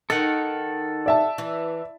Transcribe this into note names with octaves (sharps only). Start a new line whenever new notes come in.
D#3 A4 F#5
D5 E5 A5
E3